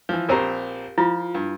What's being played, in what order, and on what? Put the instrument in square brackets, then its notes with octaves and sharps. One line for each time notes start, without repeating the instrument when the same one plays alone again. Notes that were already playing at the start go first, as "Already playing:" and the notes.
[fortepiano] E3 F3
[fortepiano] A#1 C4 A#5 [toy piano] G4 A#4
[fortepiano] F3 [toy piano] E4 F4
[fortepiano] G2